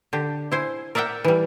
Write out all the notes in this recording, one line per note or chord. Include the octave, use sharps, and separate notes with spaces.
D3 G4
E4 C5 G#5
A#4 D5 E5 F#5 G5
E3 G3